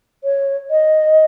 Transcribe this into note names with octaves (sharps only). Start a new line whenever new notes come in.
C#5
D#5